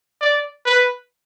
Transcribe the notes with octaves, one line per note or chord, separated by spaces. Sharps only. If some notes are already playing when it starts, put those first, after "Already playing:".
D5
B4